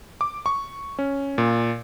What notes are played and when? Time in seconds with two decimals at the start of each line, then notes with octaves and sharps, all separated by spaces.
0.21 D6
0.46 C#6
0.99 C#4
1.38 A#2